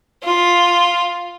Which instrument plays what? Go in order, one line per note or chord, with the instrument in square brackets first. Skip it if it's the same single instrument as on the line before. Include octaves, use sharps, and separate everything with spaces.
[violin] F4